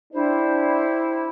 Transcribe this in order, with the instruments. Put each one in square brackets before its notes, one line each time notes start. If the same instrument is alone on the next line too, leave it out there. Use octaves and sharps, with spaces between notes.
[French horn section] D4 [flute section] E4 G4 C5